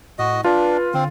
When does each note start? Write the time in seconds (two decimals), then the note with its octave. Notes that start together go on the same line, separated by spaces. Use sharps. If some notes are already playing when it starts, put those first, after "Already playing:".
0.19 A2 F#4 D#5
0.44 D4 F4 B4
0.94 D3 C4